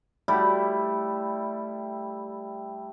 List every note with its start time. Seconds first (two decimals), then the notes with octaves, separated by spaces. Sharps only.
0.28 G3 A3 E4